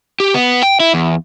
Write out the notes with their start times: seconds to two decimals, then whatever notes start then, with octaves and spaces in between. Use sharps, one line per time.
0.20 G4
0.34 B3
0.63 G5
0.80 E4
0.94 E2